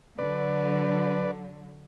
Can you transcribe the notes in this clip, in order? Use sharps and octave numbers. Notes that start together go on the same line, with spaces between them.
D3 F#3 B4 D5